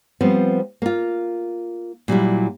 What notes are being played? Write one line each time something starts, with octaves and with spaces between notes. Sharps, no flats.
F3 G3 B3 C4
A#3 F4
A#2 F#3 G3 E4